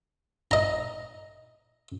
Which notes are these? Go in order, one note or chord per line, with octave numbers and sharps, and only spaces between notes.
D#5 A#5